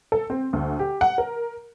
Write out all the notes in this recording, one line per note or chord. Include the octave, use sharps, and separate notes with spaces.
A4
C4
D2
G4
F#5
A#4